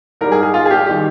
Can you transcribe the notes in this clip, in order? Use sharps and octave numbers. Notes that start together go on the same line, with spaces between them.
G#2 G3 A#4
G#4
G#4
F4
G#4
G4
D#3 G3 G4